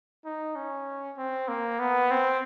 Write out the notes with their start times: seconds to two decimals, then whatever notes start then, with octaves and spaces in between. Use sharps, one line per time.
0.25 D#4
0.56 C#4
1.17 C4
1.48 A#3
1.79 B3
2.11 C4